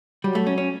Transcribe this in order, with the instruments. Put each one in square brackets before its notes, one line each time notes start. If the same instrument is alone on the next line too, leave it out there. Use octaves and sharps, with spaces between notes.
[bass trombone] F#3 [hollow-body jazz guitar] G3
[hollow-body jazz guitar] A3
C#4
C#4